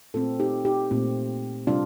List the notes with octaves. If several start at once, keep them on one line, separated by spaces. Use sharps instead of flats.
A#2 A3 C4 F4 A4
D#4 G4
D#4 G4
A#2 A3 C4
C3 G3 D4 F4